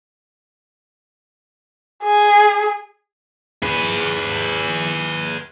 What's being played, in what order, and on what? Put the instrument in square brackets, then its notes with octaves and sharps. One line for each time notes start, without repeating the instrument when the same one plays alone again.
[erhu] G#4
[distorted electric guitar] G#4 B4